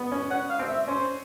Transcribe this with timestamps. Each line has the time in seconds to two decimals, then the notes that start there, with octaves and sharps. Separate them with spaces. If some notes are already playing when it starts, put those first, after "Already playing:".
Already playing: B3
0.12 C#4
0.30 C#4 F#5
0.50 F5
0.59 C4
0.69 E5
0.87 C#4 C5